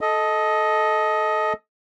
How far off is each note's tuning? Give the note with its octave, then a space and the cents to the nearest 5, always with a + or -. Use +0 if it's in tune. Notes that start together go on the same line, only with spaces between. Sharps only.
A4 -15 D#5 +10